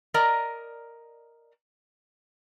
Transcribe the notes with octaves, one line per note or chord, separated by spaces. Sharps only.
A#4 D5 D#5 A#5